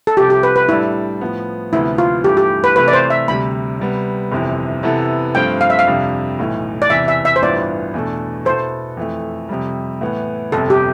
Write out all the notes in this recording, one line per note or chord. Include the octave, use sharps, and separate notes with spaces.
A4
C2 C3 F3 G4
G4
B4
B4
A2 G3 D4 E4 A4 D5
A2 F3 B3
D2 C3 F3 B3 E4 F4
F4
G2 E3 A3 G4
G4
B4
C3 E3 A3 B4
D5
C5
E5
D2 C3 G3 B5
C3 G3 B3
G1 F2 C3 E3
C3 E3 B3 E4 A4
G2 F3 A3 C4 F4 G5
F5
E5
F5
F2 C3 G3 D4
B1 A2 E3
D5
E2 C3 E3 E5
E5
E5
C5
A1 G2 E3 B3 F4 D5
E2 B2 A3 D4 A4
B2 B3 E4 A4 C5
F2 E3 A3
F2 C3 G3
A2 E3 B3
G1 F2 C3 A4
G4